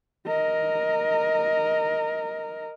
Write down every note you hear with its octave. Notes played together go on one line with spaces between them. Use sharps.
A#4 D#5